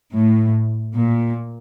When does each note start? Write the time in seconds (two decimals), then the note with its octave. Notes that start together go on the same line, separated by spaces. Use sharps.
0.12 A2
0.94 A#2